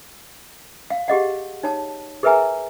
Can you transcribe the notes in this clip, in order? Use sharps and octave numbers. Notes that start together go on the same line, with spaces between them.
F5
G4 G#4 D#5 F#5
D#4 C#5 A5
G#4 A#4 B4 E5 G#5 A#5